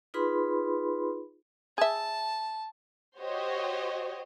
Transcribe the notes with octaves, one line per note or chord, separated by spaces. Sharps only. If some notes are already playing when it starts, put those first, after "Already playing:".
D#4 F4 G#4 B4 B5 C6
G#4 E5 A5
F#4 G4 C5 C#5 D#5